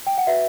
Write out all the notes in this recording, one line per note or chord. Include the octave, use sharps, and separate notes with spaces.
G5
F#5
F#4 B4 E5